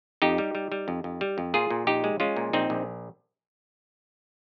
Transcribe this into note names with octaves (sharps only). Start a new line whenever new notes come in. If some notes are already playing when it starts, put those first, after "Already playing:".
F2 D#4 G4
G3
G3
G3
F2
F2
G3
F2
A#2 F4 G#4
A#2
A#1 D#4 G4
G#3
G#3 C#4 F4
A#2
A#1 C4 D#4
A#1